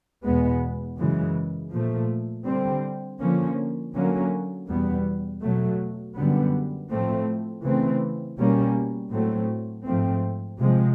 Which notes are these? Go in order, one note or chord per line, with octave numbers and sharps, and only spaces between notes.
E2 B2 G#3 B3
F#2 C#3 E3 G#3
A#2 F3 A3
D3 G3 C4
D3 F3 A#3 C#4
D3 F#3 A#3 C#4
E2 B2 G3 B3
B2 F#3 A3
F#2 D3 G3 B3
A2 F3 A3 C4
C#3 E3 A3 C4
B2 G3 A#3 C#4
A2 F#3 A3 C4
G#2 F3 A3 C4
C3 F3 G#3